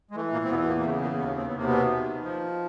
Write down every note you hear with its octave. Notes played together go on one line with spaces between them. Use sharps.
G#3
E3 A3
A#2 A#3
C4
E2 B2 B3
A#2 A#3
A#3
C#3 A3
A#2 A#3
D#2 B2 B3
C4
B3
C3 A#3
B2 B3
D#3
F3